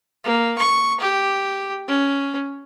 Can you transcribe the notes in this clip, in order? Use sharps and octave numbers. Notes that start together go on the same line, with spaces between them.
A#3
C#6
G4
C#4